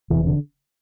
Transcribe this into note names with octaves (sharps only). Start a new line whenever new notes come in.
E1 E2 C3 E3
D3